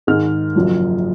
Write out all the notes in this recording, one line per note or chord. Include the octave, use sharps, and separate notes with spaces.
G#2 D#3 G#3 F6
F#1 F#2 F3